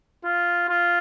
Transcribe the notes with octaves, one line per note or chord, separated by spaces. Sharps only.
F4
F4